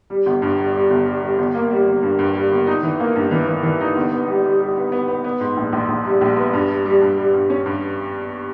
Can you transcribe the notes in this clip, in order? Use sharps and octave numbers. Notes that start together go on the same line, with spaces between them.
G3
G1
G2
G3
G3
G1
G3
G3
G1
A#3
G3
G1
G2
G2
G3
G1
D#4
E3
A#3
G2
E3
E3
E3
D#4
G1
B3
G3
G3
G3
B3
B3
B3
B3
G#2
A#1
A#1
A#1
G3
A#1
B3
G2
G3
G3
G2
G3
G2
C#4
G2